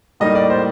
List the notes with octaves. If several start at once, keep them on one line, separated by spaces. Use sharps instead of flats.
A2 G3 A#3 D#4 D#5
D5
C5